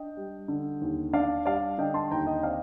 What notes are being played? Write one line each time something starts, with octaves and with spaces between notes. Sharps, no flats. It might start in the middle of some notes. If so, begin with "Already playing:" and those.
Already playing: D4 D#5 G5
G3
D3
D#2
D4 D5 F5
G3 D5 F5
D3 D#5 G5
A5 C6
D#2 G5 A#5
D#5 G5
C4 D5 F5